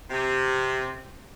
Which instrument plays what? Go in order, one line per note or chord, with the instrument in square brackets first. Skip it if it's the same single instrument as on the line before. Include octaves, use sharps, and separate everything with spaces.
[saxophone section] C3